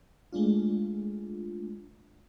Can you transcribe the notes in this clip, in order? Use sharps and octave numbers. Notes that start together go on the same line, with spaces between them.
G#3 A3 D4 F4